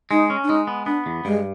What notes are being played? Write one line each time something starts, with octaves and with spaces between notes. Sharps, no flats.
G#3 D#4
C#4
D4
G#3 D#4
B3
B3 D4
E2
G2 G#3